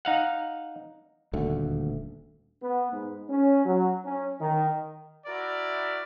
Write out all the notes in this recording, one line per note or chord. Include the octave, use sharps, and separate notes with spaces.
D#4 F5 F#5
D#1 D2 A3
B3
G#2
C#4
F#3
C#4
D#3
E4 F#4 A#4 D5